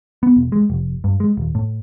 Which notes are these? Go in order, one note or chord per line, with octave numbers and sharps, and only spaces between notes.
B3
E1
G#3
F1
G2
G#3
D#1
A2